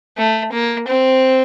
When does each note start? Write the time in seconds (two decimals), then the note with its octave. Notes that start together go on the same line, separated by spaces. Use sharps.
0.18 A3
0.53 A#3
0.88 C4